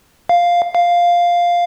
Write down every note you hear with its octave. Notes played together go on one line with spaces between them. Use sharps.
F5
F5